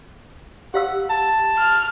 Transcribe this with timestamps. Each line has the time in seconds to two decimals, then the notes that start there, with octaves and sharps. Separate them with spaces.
0.74 G4 F5 F#5 E6
1.10 A5
1.58 F6